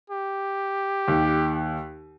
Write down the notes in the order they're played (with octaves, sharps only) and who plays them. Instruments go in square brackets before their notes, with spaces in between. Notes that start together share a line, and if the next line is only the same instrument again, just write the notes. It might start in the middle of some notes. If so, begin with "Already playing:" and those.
[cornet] G4
[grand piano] D#2